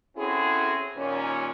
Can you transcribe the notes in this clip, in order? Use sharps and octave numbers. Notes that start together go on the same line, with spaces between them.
C4 C#4 E4 F#4 G#4 A4
D#2 A#2 C#4